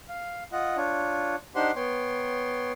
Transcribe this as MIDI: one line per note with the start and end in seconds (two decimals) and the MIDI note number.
0.09 0.44 77
0.52 0.77 65
0.52 0.77 75
0.52 0.77 78
0.77 1.36 62
0.77 1.36 65
0.77 1.36 73
1.55 1.72 62
1.55 1.72 63
1.55 1.72 67
1.55 1.72 72
1.55 1.72 78
1.55 1.72 84
1.76 2.72 59
1.76 2.72 73
1.76 2.72 79
1.76 2.72 84